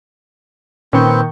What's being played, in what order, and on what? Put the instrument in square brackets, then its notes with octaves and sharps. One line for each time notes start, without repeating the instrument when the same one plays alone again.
[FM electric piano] A#2 C#6 G6 [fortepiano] D#3 [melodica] C4 B4 [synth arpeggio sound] C#4